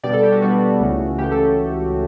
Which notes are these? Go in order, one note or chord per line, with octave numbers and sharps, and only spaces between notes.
B2 G3 B3 D4 D5
A4
G4
F#4
B2 G3 B3 D4 F#4
C#2 C#3 E3 A3 C#4
C#2 C#3 E3 A3 C#4 G4
A4